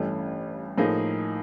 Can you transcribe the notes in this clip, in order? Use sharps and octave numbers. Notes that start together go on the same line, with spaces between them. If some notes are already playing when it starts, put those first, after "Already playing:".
Already playing: A1 G2 E3 A3 C#4
A2 F3 A#3 D#4 G#4